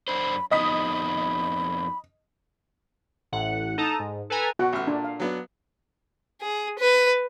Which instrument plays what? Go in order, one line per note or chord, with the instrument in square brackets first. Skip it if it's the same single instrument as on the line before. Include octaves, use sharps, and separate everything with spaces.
[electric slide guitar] F#2 D4 C5 [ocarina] B5
[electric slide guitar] F2 B3 D#4 [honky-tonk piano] D#5 D#6 B6 [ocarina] B5
[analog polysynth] A1 A2 F#5
D#4 A4 A5 A#5 D#6
G#2
A4 B4 G#5 A#5
[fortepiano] B2 [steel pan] F#4 F#5
[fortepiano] A1 F6
[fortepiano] A#2 [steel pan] D4
[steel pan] F5
[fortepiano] F#3 B3 D4
[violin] G#4
B4